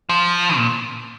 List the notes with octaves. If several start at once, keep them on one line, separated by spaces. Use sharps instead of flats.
F3
A#2